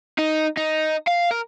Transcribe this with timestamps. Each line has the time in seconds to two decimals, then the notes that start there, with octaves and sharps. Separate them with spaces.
0.19 D#4
0.57 D#4
1.08 F5
1.31 A#4